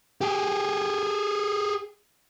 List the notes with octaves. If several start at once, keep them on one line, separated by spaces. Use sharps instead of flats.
G4 G#4